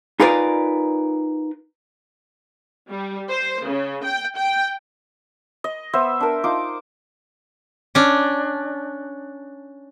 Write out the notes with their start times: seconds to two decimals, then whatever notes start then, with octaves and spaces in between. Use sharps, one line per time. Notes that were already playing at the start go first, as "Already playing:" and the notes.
0.20 D#4 F4 G#4 A#4 B4 D5
2.90 G3
3.30 C5
3.66 C#3
4.04 G5
4.38 G5
5.64 D#5
5.93 B3 C5 E5
6.20 D4 A#4
6.44 D#4 F4 D6
7.95 C#4 D4